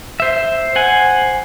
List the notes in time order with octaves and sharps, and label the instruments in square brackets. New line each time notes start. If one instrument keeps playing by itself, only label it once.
[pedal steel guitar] C5 E5
C5 F#5 G#5